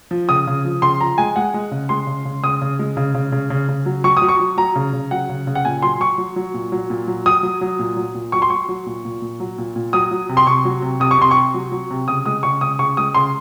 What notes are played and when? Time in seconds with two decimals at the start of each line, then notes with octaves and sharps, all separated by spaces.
0.11 F3
0.29 C#3 D#6
0.47 C#3
0.65 F3
0.82 C#3 C6
1.00 F3 A#5
1.18 G#3 G#5
1.36 G#3 F#5
1.54 G#3
1.71 C#3
1.89 G#3 C6
2.07 C#3
2.25 C#3
2.43 C#3 D#6
2.62 C#3
2.79 G#3
2.97 C#3
3.15 C#3
3.32 C#3
3.50 C#3
3.68 C#3
3.86 F#3
4.04 F#3 C#6
4.17 F#3 D#6
4.29 C#6
4.40 F#3
4.57 F#3 A#5
4.76 C#3
4.93 C#3
5.11 F#3 F#5
5.29 C#3
5.47 C#3
5.55 F#5
5.65 A#2 G#5
5.82 F#3 C6
6.00 F#3 C#6
6.18 F#3
6.36 F#3
6.54 A#2
6.72 F#3
6.90 A#2
7.08 F#3
7.26 F#3 D#6
7.43 F#3
7.61 F#3
7.79 A#2
7.97 F#3
8.15 A#2
8.32 F#3 C#6
8.42 C6
8.50 F#3 C#6
8.69 F#3
8.86 A#2
9.05 A#2
9.22 A#2
9.40 F#3
9.58 A#2
9.76 A#2
9.93 F#3 D#6
10.11 F#3
10.29 C3
10.37 C6
10.47 C3 C#6
10.65 F#3
10.82 C3
11.00 C3 D#6
11.11 C#6
11.18 C3 C6
11.31 C#6
11.36 C3
11.54 F#3
11.72 F#3
11.91 C3
12.08 C#3 D#6
12.26 G#3 D#6
12.43 C#3 C#6
12.61 C#3 D#6
12.79 C#3 C#6
12.97 G#3 D#6
13.15 C#3 C6